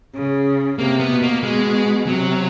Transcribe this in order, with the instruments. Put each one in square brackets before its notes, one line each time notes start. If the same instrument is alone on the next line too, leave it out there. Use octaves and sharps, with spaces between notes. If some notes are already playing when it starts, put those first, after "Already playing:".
[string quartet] C#3
[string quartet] C3 [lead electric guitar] A#3
[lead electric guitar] B3
[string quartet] B2
[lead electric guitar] A#3
[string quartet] B2 [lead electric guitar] G#3
[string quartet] C3 [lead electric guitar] F#3